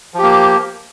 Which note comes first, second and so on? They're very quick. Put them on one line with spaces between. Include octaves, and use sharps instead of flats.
F3 G4 A#3